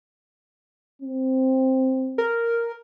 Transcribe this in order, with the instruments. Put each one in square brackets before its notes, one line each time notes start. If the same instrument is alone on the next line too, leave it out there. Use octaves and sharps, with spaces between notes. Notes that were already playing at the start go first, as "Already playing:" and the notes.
[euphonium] C4
[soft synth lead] A#4